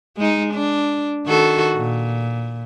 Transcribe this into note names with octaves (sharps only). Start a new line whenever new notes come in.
G#3 D#4
D4
D#3 F#4 A4
A#2